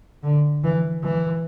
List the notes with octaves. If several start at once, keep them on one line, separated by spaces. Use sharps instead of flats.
D3
E3
E3